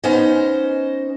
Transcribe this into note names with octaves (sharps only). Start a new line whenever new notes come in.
B3 C#4 D#4 C5 D#5